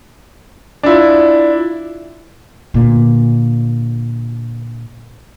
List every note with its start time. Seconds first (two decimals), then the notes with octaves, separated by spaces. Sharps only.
0.83 D4 E4 F4 D5
2.74 A#2 D3